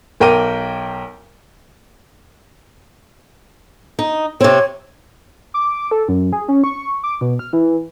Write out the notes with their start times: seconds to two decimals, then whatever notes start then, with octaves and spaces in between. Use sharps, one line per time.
0.20 B1 A#4 G5 D6 D#7
3.99 D#4
4.41 C3 C4 C#5
5.54 D6
5.91 A4
6.08 F#2
6.33 G#4
6.48 C#4
6.64 C#6
7.03 D6
7.21 B2
7.39 F6
7.53 E3